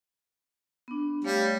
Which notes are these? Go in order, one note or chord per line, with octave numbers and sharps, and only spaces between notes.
B3 D4
G3 A3 C#5 F5